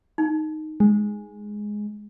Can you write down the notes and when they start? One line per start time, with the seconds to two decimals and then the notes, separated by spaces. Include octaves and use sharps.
0.18 D#4
0.80 G#3